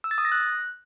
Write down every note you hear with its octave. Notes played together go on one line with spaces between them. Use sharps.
E6
A6
D#6
A#6
F#6